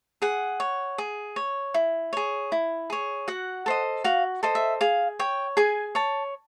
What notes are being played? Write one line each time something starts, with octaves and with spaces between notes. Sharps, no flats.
G#4 F#5
C#5
G#4
C#5
E4
G#4 C#5
E4
G#4 C#5
F#4 F#5
A4 C5 D#5
F#4 F5
A4 C5 D#5
E5
G#4 F5
C#5 G5
G#4 G#5
C#5 A5